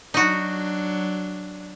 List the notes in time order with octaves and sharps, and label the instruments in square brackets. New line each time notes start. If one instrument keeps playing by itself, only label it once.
[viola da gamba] F#3 D4 [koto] D#4 F#4